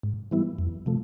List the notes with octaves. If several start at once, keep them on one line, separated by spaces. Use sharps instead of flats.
G#2
E3 G3 B3 E4
F2
C3 F3 A3